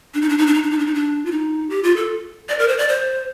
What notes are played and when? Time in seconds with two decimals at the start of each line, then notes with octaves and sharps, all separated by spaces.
0.14 D4
0.22 D#4
0.29 D4
0.38 D#4
0.47 D4
0.54 D#4
0.63 D4
0.71 D#4
0.79 D4
0.86 D#4
0.94 D4
1.25 F4
1.32 D#4
1.70 G4
1.83 F4
1.96 A4
2.49 D5
2.59 A#4
2.68 C5
2.78 D5
2.88 C5